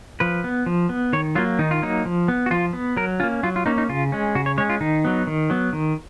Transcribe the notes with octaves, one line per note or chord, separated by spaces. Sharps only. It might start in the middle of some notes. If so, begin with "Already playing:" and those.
F3 B4
B3
F3
B3
D#3 C#5
F#3 A#3 F4
D#3 D#4
F4
F#3 A#3 D#4
F3
B3
F#4
F3 F4
B3
F#3 A#4
A#3 C#4 F4
F#3 F4
F4
A#3 C#4 D#4
D#4
C#3 F4
G#3 C#4
C#3 F#4
C#5
G#3 C#4 C#5
F4
D#3 D#4
F#3 B3
D#3
F#3 B3
D#3